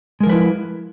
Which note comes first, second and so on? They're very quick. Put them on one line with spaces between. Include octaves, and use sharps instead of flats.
G#3 A#4 F3 B4 E4